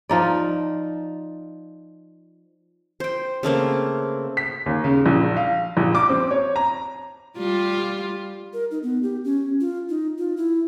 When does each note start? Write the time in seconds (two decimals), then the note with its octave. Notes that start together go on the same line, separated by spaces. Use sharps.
0.09 F3 D#4 D5
3.00 C5 G5
3.43 C#3 A3 A#3 C4
4.37 B6
4.66 D#2
4.84 C#3
5.06 A#1
5.37 F5
5.77 A#1
5.95 D6
6.09 C4
6.31 C#5
6.56 A#5
7.37 G3 F4
8.53 A#4
8.71 D#4
8.83 B3
9.03 G4
9.25 C#4
9.61 F4
9.89 D#4
10.18 F4
10.37 E4